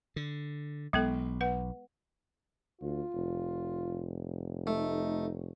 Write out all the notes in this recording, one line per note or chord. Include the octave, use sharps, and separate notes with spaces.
D3
B1 G#3 B3 A4
B4 F#5
D2 F4
F1
A3 D#4